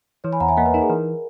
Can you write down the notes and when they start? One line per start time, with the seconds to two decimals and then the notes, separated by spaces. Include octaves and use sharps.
0.24 E3 C#5
0.33 G#5 B5
0.40 E2 F#5 A#5
0.49 E5 G#5
0.57 A#3 D#5 F#5
0.66 B4
0.74 D#4 A#4
0.82 G#4
0.89 E3 A#4